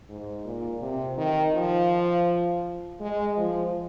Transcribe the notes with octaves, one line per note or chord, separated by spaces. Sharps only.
G#2
A#2
C3
D#3
F3
G#3
F3